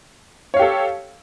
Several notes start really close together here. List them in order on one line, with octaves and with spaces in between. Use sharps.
C#5 F5 G4 A4